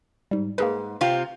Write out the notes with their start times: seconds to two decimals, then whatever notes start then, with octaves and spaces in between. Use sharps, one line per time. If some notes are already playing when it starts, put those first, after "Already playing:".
0.31 G#2 G3
0.58 G#2 A#3 G#4 B4
1.01 C3 C4 F4